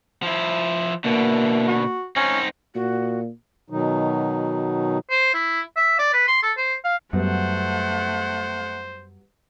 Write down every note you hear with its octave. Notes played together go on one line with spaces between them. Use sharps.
F3 E4
B2 D3 E3 A#3
F#4
C4 C#4 D#4
A#2 F#4
B2 D#3 F#3 D#4
C5
E4
E5
D5
B4
C6
A4
C5
F5
F#2 F#3 G3 A3 B3 C5 F#5